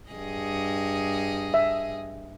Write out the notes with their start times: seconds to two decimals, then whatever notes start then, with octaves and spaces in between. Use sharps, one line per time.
0.10 G2 G#4 D#5
1.54 E5